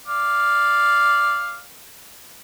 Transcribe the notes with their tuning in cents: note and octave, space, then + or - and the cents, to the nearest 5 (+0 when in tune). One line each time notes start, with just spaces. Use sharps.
D5 +0 F5 +0